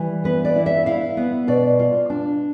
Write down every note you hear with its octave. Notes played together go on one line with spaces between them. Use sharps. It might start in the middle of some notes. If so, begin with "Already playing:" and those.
Already playing: E3 G3
B3 B4
D5
E4
E5
E4 F5
B3
B2 D5
F4
D4